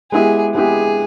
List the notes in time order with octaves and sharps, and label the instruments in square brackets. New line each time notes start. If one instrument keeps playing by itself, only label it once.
[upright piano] G#3 B3 E4 G4 [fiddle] G#4
[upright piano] G#3 B3 E4 G4 [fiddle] G#4